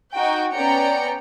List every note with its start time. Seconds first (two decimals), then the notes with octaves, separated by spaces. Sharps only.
0.13 D#4 F#4 G5
0.53 B3 C#4 D5 G5 A#5 C#7